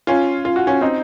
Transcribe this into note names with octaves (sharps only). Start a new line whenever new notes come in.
C#4 F4
F4
F#4
C#4 F4
C4 D#4